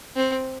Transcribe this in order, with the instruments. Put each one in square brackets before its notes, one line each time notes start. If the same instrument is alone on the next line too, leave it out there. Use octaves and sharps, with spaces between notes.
[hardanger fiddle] C4